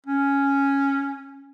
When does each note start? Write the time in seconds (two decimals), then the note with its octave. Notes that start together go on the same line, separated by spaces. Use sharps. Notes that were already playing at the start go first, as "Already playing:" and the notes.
0.06 C#4